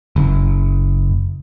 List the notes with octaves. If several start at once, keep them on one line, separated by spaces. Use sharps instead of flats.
F#1